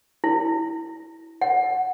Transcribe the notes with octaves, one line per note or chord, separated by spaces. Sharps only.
E4
F#5